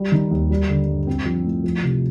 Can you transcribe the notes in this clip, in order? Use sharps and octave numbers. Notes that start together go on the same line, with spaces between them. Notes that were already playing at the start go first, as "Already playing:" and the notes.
Already playing: G3
D#3
D#2
G3
D3
G2
C4
F3
A2
F3
C3